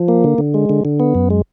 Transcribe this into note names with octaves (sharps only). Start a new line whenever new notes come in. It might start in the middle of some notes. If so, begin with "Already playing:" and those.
Already playing: F3
A#3
D3
D3
G#3
D3
D3
B3
F#2
G#3